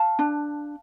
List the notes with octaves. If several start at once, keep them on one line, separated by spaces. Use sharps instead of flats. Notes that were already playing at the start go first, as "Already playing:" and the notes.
Already playing: F5 A5
D4